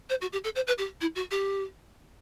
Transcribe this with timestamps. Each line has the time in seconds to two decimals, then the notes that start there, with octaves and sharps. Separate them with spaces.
0.10 C5
0.21 F#4
0.33 G4
0.44 A4
0.56 C5
0.67 B4
0.78 G4
1.01 E4
1.16 F#4
1.31 G4